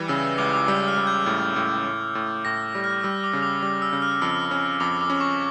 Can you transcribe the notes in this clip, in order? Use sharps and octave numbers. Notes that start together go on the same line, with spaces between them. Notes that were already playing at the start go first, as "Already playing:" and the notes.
Already playing: E3 G3
C#3 E6
E6
C#2 D6
D6
G3 E6
F6
G3
G6
A2
A2
A2
A2
A2 A#6
G3
F6
G3 E6
D6
C#3
D6
G3 D6
E6
C#3
F6
F2 E6
C#4
F2 D6
D6
C#4
C#6